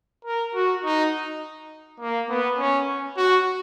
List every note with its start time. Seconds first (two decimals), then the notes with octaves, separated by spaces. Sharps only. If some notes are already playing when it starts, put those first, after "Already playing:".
0.25 A#4
0.55 F#4
0.84 D#4
2.00 A#3
2.29 B3
2.58 C#4
3.17 F#4